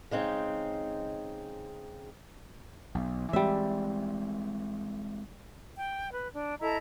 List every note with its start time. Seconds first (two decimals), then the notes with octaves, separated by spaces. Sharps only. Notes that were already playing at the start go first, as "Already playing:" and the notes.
0.11 C#3 G#3 C4 D#4
2.95 B1
3.33 E3 G3 G#3 C4 E5
5.76 G5
6.12 B4
6.33 D4
6.60 E4 A4 D#5 A#5